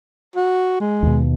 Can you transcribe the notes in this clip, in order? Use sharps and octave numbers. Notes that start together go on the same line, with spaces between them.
F#4
G#3
D#2 B2